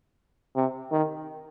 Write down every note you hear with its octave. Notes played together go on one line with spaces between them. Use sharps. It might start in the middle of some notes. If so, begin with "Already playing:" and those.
C3
D#3